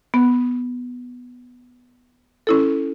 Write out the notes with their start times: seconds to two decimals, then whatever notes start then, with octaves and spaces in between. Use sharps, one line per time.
0.14 B3
2.47 C#4 E4 A4